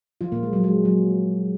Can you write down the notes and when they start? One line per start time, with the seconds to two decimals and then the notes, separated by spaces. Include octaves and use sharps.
0.21 F3 F4
0.32 A#2 A#3
0.43 G#3
0.53 F#3
0.64 G#3
0.85 F#3